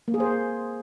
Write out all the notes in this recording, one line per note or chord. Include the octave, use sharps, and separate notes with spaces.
A#3
G#4
C5